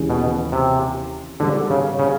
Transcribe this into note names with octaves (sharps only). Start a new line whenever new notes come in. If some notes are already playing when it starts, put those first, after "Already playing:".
Already playing: D#2 C#3 E3 G#3 C#4
B2
C3
G#2 D3 D#3 G3
C#3
C#3